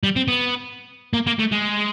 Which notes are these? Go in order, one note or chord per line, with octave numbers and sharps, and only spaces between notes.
G3
C4
B3
A#3
A#3
A3
G#3